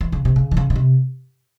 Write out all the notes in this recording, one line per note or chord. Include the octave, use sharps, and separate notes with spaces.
E3
C#3
C3
C#3
E3
C#3
C#3
C3